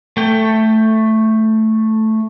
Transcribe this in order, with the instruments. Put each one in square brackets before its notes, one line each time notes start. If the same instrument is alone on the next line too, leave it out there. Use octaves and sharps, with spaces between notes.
[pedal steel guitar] A3 G5